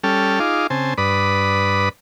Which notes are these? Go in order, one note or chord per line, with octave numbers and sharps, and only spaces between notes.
G3 C#4 A4 G5 A5 F6
D#4 F4 G#4 F5 D6
C#3 C4 C5 G#5 A5
G2 B4 D5 B5 D#6